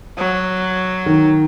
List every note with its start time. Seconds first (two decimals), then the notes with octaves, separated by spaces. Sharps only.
0.18 F#3
1.06 D#3